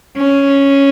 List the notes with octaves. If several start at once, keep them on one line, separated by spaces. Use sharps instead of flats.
C#4